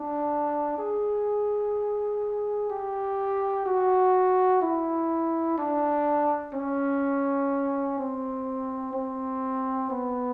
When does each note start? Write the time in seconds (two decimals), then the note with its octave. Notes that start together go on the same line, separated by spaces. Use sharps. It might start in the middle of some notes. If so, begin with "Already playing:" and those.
Already playing: D4
0.78 G#4
2.70 G4
3.66 F#4
4.62 E4
5.58 D4
6.54 C#4
7.98 C4
8.94 C4
9.90 B3